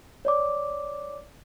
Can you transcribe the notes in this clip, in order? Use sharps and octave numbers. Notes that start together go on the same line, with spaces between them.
C#5 D5 D6